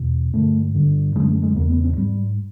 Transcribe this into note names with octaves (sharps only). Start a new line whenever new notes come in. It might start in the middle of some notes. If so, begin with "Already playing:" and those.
Already playing: E2 B2
G2 D3 A3
G2 D3
F#2 D3 G#3
A3
G#3
E2 C#3 A#3
B3
C4
G#2 G3